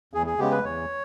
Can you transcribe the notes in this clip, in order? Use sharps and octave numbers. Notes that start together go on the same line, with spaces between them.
E2 G#4
G#4
C#3 G#3 B3 G4
B4
E2 C#5